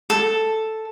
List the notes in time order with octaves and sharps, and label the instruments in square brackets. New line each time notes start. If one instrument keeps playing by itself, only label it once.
[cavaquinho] A4